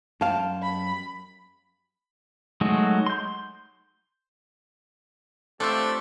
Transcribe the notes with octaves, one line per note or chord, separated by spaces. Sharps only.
F#2 C#5 F5 G5 A5
B5
F#3 G#3 A3 D#4 F#4
C6 G6
A3 C4 D4 F4 G4 A4 C5